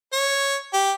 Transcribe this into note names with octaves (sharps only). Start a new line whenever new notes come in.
C#5
G4